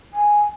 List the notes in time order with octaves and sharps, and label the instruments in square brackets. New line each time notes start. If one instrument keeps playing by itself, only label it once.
[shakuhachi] G#5